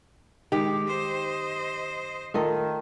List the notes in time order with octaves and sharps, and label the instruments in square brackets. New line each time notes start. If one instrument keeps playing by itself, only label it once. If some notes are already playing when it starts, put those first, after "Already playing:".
[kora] D#3 [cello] G#3 [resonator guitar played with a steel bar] G4
[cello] C5 D#5
[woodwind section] D#3 [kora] A3 F4 D#5